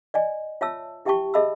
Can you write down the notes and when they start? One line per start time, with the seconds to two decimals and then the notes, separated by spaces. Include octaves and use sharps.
0.14 D5 D#5 G#5
0.61 F4 C#5 E5 A5 E6
1.05 E4 G4 E5 G5 A5 C#6
1.34 G#4 D#5 E5 A5 B5 E6